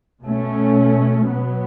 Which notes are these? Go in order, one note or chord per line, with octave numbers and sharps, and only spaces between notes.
B2 A3 C#4
B2 F#3 B3